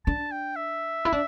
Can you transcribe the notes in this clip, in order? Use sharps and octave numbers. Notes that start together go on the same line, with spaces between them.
D4 A5
G5
E5
E4
D4